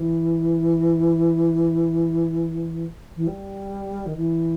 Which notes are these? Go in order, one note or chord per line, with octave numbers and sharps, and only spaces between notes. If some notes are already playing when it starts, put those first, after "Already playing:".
Already playing: E3
E3
G3
D#3
E3